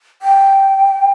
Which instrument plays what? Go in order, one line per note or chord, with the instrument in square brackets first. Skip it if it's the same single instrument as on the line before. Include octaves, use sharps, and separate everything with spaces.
[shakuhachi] G5